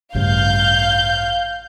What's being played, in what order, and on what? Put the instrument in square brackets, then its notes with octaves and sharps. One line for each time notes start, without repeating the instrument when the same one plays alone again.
[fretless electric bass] A1 G2 C#3 [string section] F5 G6